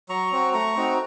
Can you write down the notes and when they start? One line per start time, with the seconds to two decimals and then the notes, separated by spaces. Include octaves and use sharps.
0.09 F#3 A#5 C#6
0.32 C4 F#4
0.53 A3 A#5 C#6
0.76 C4 D#4 F#4